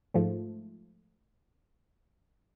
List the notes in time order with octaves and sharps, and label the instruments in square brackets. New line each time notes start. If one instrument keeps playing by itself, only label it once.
[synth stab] G#2 F3 A3